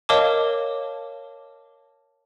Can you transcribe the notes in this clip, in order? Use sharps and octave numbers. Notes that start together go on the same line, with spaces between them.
A#4 C#5 D#5 F5 A5 D6